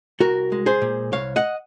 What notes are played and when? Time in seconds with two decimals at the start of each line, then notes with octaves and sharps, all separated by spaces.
0.20 C2 F#4 A#4
0.52 G#3
0.66 G#4 C5
0.82 A#2
1.13 C2 C#5 F5
1.36 D#5 F#5